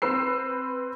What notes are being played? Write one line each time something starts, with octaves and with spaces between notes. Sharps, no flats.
C4 B4 E6 C7